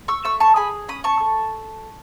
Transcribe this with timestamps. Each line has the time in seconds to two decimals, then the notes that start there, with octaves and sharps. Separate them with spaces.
0.08 C#6 E6
0.24 A3 C#6 E6
0.40 A5 C#6
0.56 G#4 G#5 B5
0.88 C#4 B5 D#6
1.04 A5 C#6
1.20 A4